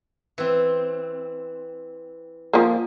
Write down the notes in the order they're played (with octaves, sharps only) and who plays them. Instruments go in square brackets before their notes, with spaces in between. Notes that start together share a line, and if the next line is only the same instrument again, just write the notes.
[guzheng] E3 C4
[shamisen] F3 A#3